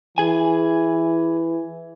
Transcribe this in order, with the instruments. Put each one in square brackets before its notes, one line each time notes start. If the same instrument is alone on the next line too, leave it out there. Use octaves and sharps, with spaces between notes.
[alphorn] E3 [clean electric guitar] G#4 G#5